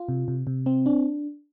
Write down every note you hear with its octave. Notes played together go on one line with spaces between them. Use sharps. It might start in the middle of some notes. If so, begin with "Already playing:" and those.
Already playing: F4
C3
C3
C3
C4
D4